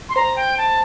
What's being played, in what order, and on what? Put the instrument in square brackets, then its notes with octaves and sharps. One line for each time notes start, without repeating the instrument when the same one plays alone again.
[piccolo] C6
[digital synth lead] C5 [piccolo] A#5
[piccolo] G5
A5